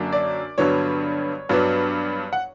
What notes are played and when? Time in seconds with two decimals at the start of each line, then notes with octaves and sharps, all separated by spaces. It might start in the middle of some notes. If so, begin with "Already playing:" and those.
Already playing: F#2 D3 F#3 A#3 D4
0.13 D5
0.58 G2 D3 F#3 B3 C#5
1.49 G2 F#3 B3 D4
2.33 F#5